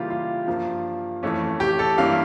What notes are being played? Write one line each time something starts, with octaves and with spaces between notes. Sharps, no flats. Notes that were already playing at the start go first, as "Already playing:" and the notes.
Already playing: C#3 E3 G3 A#3 F4 G4
F4
G2 F3 A#3
F2 E3 A3 C#4
G4
A4
G2 E3 G3 A#3 C#4 F5